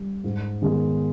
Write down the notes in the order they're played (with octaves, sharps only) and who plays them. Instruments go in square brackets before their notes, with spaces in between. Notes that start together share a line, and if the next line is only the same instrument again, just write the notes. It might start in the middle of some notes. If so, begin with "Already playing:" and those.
Already playing: [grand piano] G3
G#2
D#3 G#3 B3